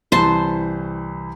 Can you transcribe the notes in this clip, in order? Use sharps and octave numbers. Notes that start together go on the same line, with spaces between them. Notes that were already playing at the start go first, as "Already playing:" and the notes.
C2 E3 C5 A5 C6